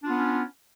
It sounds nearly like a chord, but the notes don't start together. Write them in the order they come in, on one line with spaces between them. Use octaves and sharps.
D4 F4 B3 C#4